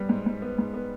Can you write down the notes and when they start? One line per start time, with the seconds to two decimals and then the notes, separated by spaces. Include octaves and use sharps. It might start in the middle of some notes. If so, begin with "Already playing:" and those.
Already playing: G3 B3
0.09 G#2
0.26 G#2
0.42 B3
0.58 G#2
0.74 B3